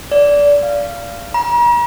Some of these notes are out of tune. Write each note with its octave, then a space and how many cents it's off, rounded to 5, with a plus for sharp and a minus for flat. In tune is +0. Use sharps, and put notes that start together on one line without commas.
D5 -20
F5 -15
A#5 +45